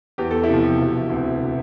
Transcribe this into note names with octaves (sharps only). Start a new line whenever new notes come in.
E2 G4
A4
E4 G4
C3 F3
E1
D2 C3